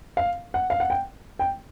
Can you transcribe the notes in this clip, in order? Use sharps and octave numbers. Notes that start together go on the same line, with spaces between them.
F5
F#5
F5
F#5
G5
G5